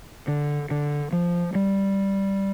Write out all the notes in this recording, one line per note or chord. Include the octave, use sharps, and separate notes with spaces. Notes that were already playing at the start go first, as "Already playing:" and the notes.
D3
D3
F3
G3